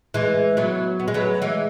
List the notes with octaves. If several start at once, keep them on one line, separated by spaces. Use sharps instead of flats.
E3 G#3
F#3 B3
B3
G#3
F#3 B3
E3 G#3